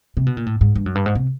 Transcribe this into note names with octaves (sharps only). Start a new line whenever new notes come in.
C3
B2
A#2
A2
G#2
G2
F#2
G2
G#2
C3